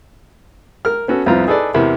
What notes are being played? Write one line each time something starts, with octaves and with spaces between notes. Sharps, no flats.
A#4 F6
B3 C#4 F#4 A4
C2 F2 B3 C4 F4 A#5
D#4 G#4 A4 B4 D5
E2 C3 A#4 E5 B5